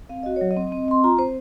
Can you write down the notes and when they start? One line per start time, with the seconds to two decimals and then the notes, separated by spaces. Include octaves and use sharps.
0.09 C4 F5
0.23 F#4 D#5
0.36 F#3 C#5
0.51 D#5
0.57 C4
0.72 C4
0.88 C4 C6
1.04 F4 A#5
1.19 C4 C5